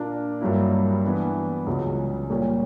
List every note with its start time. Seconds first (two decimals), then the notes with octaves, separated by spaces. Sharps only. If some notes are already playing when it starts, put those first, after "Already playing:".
Already playing: A#2 A#3 D4 A#4
0.41 G2 F#3 A#3 E4
1.04 E3 B3 D4
1.66 C#2 C#3 F#3
2.30 A#2 G3 C#4